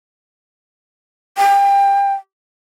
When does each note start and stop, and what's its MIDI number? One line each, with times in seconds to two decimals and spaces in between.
1.37 2.14 79